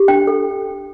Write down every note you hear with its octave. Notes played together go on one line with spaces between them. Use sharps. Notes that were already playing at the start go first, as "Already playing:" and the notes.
Already playing: G4
D4 G5
A4